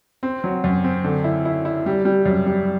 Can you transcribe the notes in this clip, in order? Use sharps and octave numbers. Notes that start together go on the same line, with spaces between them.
C4
F#3
F#2
C4
D3
E4
E4
E4
G3
G3
F#2
G3